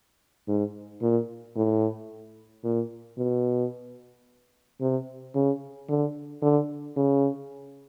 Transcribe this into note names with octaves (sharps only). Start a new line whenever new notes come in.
G#2
A#2
A2
A#2
B2
C3
C#3
D3
D3
C#3